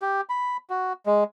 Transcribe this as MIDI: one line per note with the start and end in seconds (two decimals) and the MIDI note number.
0.02 0.21 67
0.29 0.57 83
0.70 0.93 66
1.06 1.24 56